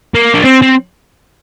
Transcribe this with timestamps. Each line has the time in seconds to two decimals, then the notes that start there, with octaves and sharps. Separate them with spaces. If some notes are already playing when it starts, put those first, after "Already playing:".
0.14 A#3
0.34 D4
0.44 C4
0.62 C4